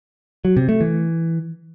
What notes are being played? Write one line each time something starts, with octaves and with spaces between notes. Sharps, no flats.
F#3
C3
A3
E3